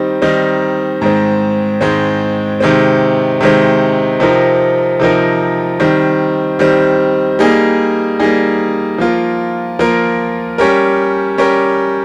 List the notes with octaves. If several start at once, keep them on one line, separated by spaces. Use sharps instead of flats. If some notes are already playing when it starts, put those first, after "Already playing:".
Already playing: D#3 G3 C4 D#4
D#3 G3 C4 D#4
G#2 D#3 G#3 C4
G#2 D#3 G#3 C4
C3 D#3 G#3 C4
C3 D#3 G#3 C4
C3 F3 C4 D#4 A#4
C3 F3 C4 D#4 A#4
D#3 G3 C4
D#3 G3 C4
G3 A#3 D#4 G#4
G3 A#3 D#4 G#4
F3 A#3 F4 A#4
F3 A#3 F4 A#4
G3 C#4 G4 A#4
G3 C#4 G4 A#4